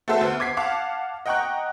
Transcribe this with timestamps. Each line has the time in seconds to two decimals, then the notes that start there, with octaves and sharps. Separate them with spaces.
0.08 A3 B3 F#4 A4 C5 E5
0.21 D2 B3
0.40 D6 G#6 B6 C7
0.57 F5 F#5 A5 D6
1.26 D#5 F#5 G5 A#5 C#6 F#6